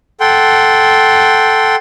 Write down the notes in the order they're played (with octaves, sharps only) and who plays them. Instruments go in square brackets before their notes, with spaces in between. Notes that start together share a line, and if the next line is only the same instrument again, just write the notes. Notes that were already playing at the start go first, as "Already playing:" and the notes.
[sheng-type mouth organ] A4 F#5 G5 C6